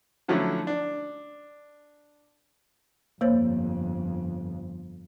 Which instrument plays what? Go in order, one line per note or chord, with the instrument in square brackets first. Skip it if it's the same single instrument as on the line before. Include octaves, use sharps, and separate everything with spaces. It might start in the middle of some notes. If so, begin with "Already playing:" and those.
[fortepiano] D3 F3 F#3 A3 C#4 E4
D4
[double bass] G1 F2 [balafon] A#3 C5 C#5